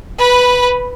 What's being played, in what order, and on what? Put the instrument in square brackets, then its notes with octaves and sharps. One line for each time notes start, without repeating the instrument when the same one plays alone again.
[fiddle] B4 B5